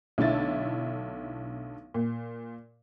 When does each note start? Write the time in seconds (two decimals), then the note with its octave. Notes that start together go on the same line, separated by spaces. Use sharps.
0.18 B1 D3 A3 E4 A6
1.94 A#2